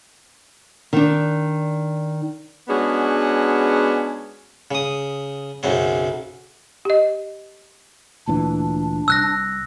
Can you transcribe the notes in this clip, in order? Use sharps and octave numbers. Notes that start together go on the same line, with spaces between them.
D#3 D4
G#3 B3 C#4 D4 F#4 G#4
C#3 D#6
B1 F#2 C#3 C4
G4 D#5
D2 A#2 E3 D4
C2 E6 F#6 A#6